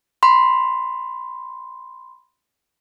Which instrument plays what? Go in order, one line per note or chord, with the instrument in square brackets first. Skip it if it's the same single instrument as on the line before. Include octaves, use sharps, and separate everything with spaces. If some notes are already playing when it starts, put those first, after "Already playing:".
[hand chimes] B5 C6